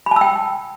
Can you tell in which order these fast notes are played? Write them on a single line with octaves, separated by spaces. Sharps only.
B5 A5 E6 G5